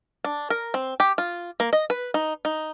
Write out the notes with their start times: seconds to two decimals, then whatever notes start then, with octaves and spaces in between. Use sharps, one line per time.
0.24 D4
0.50 A#4
0.74 C4
1.00 G4
1.18 F4
1.60 A#3
1.73 D#5
1.90 B4
2.14 D#4
2.45 D#4